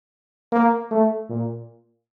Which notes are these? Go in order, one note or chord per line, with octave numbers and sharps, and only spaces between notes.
A#3
A3
A#2